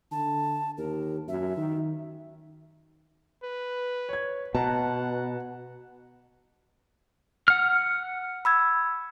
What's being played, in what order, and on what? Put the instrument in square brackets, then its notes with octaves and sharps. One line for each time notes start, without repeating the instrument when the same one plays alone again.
[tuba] D3 [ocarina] A5
[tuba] D#2 [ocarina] A#4
[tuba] F#2 [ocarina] E5
[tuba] D#3
[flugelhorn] B4
[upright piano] C#5 G#6
[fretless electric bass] B2 [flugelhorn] F#5 [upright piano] A5 A#5 F#6
[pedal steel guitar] F#5 F6
[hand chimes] B5 E6 G#6